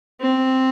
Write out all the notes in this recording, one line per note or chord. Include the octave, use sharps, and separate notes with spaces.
C4